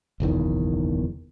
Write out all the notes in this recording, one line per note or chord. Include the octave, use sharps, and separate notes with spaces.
F#1 B1 E2 D#3